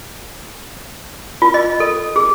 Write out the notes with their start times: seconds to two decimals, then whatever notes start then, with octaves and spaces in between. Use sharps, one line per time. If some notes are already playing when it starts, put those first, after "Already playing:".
1.42 F4
1.54 D#5
1.80 A4
2.16 G#4